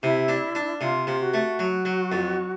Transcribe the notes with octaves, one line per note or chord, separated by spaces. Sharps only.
C3 E4
D4
D4
C3 F4
C3
F#4
A3
F#3
F#3
F2